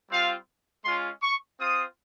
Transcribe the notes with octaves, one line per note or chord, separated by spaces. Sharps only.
G3 C4 F4 F5
G#3 C#4 F4 C6
C#6
C4 F4 D#6